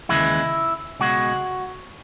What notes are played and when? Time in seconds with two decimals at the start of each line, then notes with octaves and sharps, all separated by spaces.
0.09 D#2 C#3 E3 G#3 E4
1.00 C#2 B2 G#3 F#4